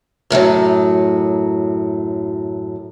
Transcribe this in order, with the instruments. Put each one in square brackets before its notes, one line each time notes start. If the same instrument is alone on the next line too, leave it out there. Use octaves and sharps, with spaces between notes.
[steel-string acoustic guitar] F#2 A2 D3 F#3